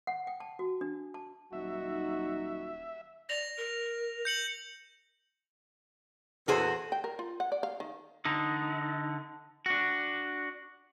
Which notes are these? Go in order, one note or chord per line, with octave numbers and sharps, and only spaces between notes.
F#5
G5
A5
F#4
D4
A5
D#1 F#3 D#4 F#4 E5
D5 A#6 F7
A#4
G6 C#7 F#7
E2 A#2 F#4 G#4 A4 C5
G5
A#4
F4
F#5
D5
F5
D#3
D3 D#4
D4 F#4